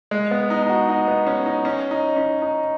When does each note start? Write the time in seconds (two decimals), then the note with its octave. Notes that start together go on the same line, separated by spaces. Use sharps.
0.11 G#3
0.31 B3
0.50 D#4
0.62 D#4
0.69 F#4
0.89 D#4
1.08 B3
1.27 C#4
1.46 D#4
1.65 C#4
1.91 D#4
2.16 C#4
2.42 D#4